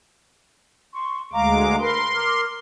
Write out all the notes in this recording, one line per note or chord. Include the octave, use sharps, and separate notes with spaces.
C6 C#6
D2 G#3 F5 A#5 D6
A#4 B4 C6
A#4 D6 F6